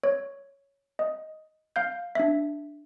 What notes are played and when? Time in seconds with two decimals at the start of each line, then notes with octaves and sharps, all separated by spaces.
0.04 C#5
0.99 D#5
1.76 F5 G6
2.15 D4 E5